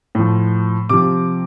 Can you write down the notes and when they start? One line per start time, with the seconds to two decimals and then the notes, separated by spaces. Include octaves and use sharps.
0.15 A2 F3
0.89 C3 F3 D6